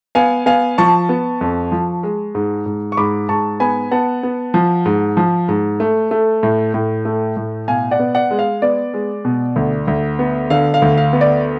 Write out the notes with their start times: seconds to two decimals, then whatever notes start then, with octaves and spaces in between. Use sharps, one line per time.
0.15 B3 F5 G#5
0.46 B3 F5 G#5
0.78 F3 A5 C#6
1.09 B3
1.41 F2
1.72 F3
2.03 G#3
2.35 G#2
2.66 G#2
2.92 C#6
2.97 G#2 B5 D6
3.29 G#2 A5 C#6
3.60 B3 G#5 B5
3.91 B3 F#5 A5
4.23 B3
4.54 F3
4.86 G#2
5.17 F3
5.48 G#2
5.80 A3
6.11 A3
6.43 A2
6.74 A2
7.05 A3
7.37 A2
7.68 B2 F5 G#5
7.91 D5 F#5
7.99 B3
8.15 D5 F#5
8.31 G#3
8.39 F5
8.62 B3 D5
8.94 G#3
9.25 B2
9.56 D2
9.88 D2
10.19 B3
10.50 D3 F5
10.74 F5
10.82 D2
10.97 F5
11.13 B3
11.21 D5